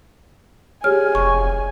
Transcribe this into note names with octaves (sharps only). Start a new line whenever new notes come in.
G4 G#4 C#5 G#5 F6
F1 C#6